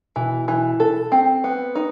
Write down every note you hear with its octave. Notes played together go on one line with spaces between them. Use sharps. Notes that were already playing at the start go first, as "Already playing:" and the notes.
B2 E3
E3
A4
C4
B3
D#4